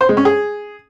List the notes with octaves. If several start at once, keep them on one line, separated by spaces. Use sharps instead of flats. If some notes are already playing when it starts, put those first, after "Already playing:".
C5
G#3
C#4
G#4